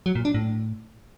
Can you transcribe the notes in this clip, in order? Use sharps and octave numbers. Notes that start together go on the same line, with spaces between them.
F#3
A#2
D4
A2